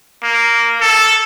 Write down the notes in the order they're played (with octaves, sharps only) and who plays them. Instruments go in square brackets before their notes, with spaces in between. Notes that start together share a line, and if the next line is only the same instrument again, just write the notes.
[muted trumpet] A#3
A4